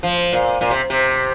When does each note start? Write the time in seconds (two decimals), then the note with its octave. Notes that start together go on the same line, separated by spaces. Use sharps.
0.03 F3
0.33 A#2
0.61 A#2
0.71 C3
0.90 C3